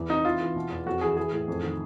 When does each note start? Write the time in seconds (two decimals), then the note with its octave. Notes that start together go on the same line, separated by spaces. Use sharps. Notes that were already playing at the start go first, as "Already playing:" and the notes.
Already playing: E2 E3
0.09 C3 D#4
0.25 E3 F4
0.41 E3
0.56 B2
0.71 E2
0.86 F2 F#4
1.01 E3 G#4
1.17 E3 G#4
1.32 A2
1.48 F2
1.62 D#3